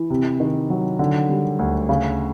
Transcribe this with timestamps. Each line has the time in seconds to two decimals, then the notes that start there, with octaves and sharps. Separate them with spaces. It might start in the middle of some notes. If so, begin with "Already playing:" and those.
Already playing: E3
0.10 C3
0.40 D#3
0.70 F#3
0.99 D3
1.29 G3
1.59 D2
1.89 C#3